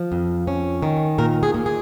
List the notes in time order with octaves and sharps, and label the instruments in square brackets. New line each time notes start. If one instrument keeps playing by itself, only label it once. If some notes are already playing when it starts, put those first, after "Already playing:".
Already playing: [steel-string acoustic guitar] F3
F2
C#4
D#3
A#2 A#4
G#4
A#2
G#4